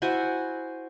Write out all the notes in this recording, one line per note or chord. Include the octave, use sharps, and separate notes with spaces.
E4 F#4 C5 G#5